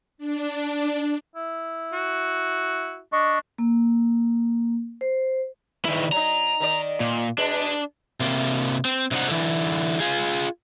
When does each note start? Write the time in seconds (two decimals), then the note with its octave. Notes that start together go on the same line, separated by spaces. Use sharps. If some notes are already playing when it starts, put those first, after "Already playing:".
0.18 D4
1.35 E4
1.93 F#4
3.13 D4 D#5 C#6
3.58 A#3
5.01 C5
5.85 E2 D#3 E4
6.12 F#3 D#4 A#5
6.60 D#3 D#4 D5
7.00 A#2
7.38 B2 G#3 B3 D4
8.20 C3 A#3
8.85 C4
9.11 C3 D4 D#4 A4 C5 F#5
9.28 D3 E3
10.00 F4 G#4